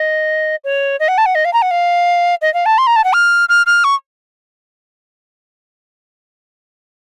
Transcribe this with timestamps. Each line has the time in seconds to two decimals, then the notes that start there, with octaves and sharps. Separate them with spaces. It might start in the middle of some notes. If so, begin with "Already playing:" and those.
Already playing: D#5
0.64 C#5
1.00 D#5
1.08 F#5
1.18 A5
1.26 F#5
1.35 D#5
1.45 F5
1.53 A#5
1.62 F#5
1.71 F5
2.42 D#5
2.54 F5
2.66 A5
2.78 C6
2.87 A#5
2.96 A5
3.04 F#5
3.13 F6
3.49 F6
3.66 F6
3.84 C#6